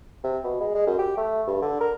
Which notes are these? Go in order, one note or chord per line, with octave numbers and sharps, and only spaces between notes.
C3
B2
G#3
G#3
F#2
G4
A3
G2
D3
A#4